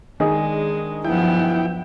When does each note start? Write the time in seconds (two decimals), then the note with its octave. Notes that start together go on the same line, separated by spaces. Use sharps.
0.20 D#3 G#3 D4 G#4 D#5
1.05 G2 F3 F#3 B3 E4 G5